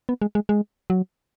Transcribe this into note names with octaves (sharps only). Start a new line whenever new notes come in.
B3
G#3
G#3
G#3
F#3